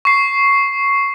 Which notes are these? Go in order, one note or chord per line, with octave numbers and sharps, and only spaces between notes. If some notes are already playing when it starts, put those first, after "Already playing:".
C#6 C7